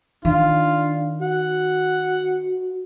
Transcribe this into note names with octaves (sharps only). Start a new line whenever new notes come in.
D#3 D4 F4
F#4 F#5